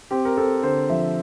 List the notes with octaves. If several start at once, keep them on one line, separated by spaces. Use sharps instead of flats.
C4 G4
A#4
C4 A4
D3 C5
F3 E5